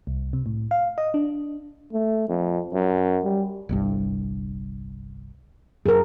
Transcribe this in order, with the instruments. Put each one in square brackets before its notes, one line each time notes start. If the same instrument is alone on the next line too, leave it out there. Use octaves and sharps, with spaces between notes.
[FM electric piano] C2
C3
A2
F5
D#5
D4
[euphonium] A3
F2
F#2
G3
[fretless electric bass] G1 C2 G2
[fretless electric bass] F#2 [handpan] G#4 A#4